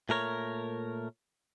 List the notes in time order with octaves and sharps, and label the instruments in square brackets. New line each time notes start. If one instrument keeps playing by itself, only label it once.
[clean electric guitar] A#2 A3 A#4 C#5